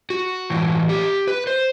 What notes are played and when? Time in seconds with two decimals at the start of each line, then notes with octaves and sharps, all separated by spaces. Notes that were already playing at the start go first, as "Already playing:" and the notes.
0.10 F#4
0.50 A2 E3
0.89 G4
1.28 B4
1.47 C5